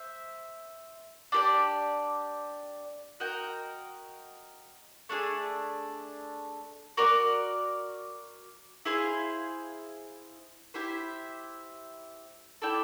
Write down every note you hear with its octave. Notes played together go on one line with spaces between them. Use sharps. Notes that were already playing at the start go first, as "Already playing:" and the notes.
Already playing: C5 E5
D4 G4 B4 D5
F#4 A#4 D#5 G5
A3 D4 F4 G#4
F#4 A#4 D5
E4 G#4 C5 F5
E4 G4 C5 E5
E4 A4 D5 G5